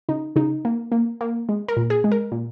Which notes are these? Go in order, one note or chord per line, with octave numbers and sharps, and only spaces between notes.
C#3 D#4
C#3 D#4
A#3
A#3
A#3
G#3
A#4
A#2
G#4
G#3
A#4
A#2